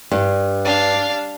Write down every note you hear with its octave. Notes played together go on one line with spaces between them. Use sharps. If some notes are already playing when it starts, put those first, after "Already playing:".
G2
D4 F5